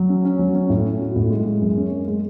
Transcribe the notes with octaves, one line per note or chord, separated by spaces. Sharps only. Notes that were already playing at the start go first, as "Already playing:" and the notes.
Already playing: F#3
C#4
C#4
F#3
C#4
A2
C#4
F#4
A2
G#3
G#3
F#2
C#4
G#3
G#3